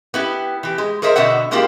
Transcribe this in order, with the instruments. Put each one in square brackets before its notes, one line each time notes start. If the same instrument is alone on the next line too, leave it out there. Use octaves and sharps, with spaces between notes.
[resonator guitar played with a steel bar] B3 E4 G4
E3 G4
G#3
G#4 A#4 C5 D#5 E5
B2 D3 D#5 E5 F#5
G#3 A#3 D4 E4 F4 G4